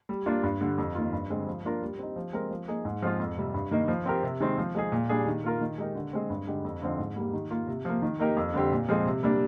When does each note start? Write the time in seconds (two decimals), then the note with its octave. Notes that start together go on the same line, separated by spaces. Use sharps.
0.09 G3
0.26 A#3 D4 F4
0.43 G2
0.61 D3 G3
0.78 F2
0.95 D#3 A#3 F4
1.13 G2
1.30 D3 G#3 C4
1.47 F3
1.64 A#3 D4 F4 A#4
1.81 G3
1.99 C4 D#4
2.16 F3
2.33 G#3 C4 G4 A#4
2.51 F3
2.68 A#3 D#4 G#4
2.85 G#2
3.02 F3 G#3 C4 F4
3.19 F2
3.37 C3 G3
3.54 G2
3.71 D#3 A#3 D#4
3.88 F3
4.05 C4 G4 A#4
4.23 C3
4.40 D#3 G#3 C4
4.58 F3
4.75 G#3 D#4 G#4
4.92 A#2
5.09 G3 D4 G#4
5.26 D#3
5.44 A#3 F4 A#4
5.61 D#3
5.78 G#3 D#4 G4 A#4
5.95 D3
6.13 G#3 C4
6.30 G2
6.47 D3 G#3 D#4 G4
6.65 F2
6.82 D3 F3 C4 D#4
6.99 G#2
7.16 G3 A#3
7.33 D#3
7.51 A#3 F4
7.67 C3
7.85 F3 A#3
8.02 D#3
8.19 A#3 D#4 G4 A#4
8.37 F2
8.54 D3 G3 C4 G4
8.72 A#2
8.88 F3 G#3 C4
9.05 C3
9.23 G3 A#3 D4